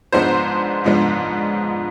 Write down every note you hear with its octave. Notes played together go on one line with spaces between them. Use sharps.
G#2 F3 G#3 B3 D4 C5
G#2 F3 G#3 B3 D4